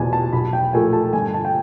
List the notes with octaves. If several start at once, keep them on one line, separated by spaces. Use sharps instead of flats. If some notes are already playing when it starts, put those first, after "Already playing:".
Already playing: E2 B2 G#5 A5
A5
B1 B5
G5
A#2 F3 A3 G#5
A5
G1 G#5
A5
G5